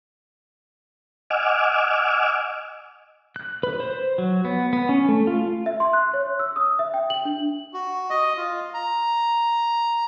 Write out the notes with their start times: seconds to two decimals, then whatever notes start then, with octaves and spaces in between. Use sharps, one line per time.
1.30 D#5 F#5 G#5 D6 E6 F6
3.36 F#6
3.63 B4
3.80 C5
4.18 F#3
4.45 B3
4.73 B3
4.89 C#4
5.09 A3
5.27 F4
5.66 E5
5.80 C6
5.93 F#6
6.14 C#5
6.39 E6
6.56 D#6
6.79 E5
6.94 G5
7.10 F#7
7.25 D4
7.73 F#4
8.10 D#5
8.37 F4
8.74 A#5